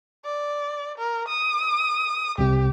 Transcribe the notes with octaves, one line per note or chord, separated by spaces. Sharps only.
D5
A#4
D#6
C2 C3 G4